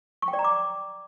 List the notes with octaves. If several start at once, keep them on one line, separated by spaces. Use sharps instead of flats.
C#6
G5
D5
A#5
D6